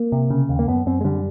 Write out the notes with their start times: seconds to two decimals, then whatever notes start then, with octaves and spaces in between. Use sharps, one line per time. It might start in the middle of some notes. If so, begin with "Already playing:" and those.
Already playing: A#3
0.12 C3
0.30 C#3
0.49 D#2
0.59 A#3
0.68 F#2 B3
0.86 F#2 C4
1.01 G#3
1.04 D3 G3